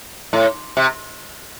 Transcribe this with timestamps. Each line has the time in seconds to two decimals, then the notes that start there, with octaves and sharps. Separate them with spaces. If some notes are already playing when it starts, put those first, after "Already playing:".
0.33 A2
0.77 C3